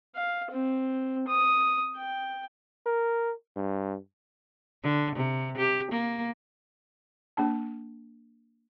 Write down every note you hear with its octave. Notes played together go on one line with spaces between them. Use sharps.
F5
C4
D#6
G5
A#4
G2
D3
C3
G4
A#3
A#3 D4 A5